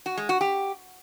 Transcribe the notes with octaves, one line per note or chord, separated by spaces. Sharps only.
F#4
G#3
F#4
G4